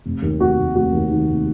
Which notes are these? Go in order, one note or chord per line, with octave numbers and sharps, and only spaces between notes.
F1
D#2
F1 F#4
F1
F1 F#4
D#2
D#3
F1